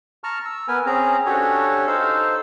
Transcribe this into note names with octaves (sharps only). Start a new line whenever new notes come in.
A5 A#5 C#6 F6
E6
B3 A#4 B4 G#5
C4 C#4 G#4 A#5
C#4 D4 F#4 G4 A4 C#5
D#4 A4 C5 F5 E6